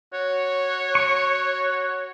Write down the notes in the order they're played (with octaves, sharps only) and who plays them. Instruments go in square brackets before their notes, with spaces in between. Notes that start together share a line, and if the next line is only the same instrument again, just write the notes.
[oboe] F#4 [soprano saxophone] C#5
[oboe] F#4 [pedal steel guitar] C#6